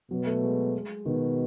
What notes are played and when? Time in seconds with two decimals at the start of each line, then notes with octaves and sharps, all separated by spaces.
0.11 B2 F#3
0.26 A3
0.43 G#3
1.06 B2 D#3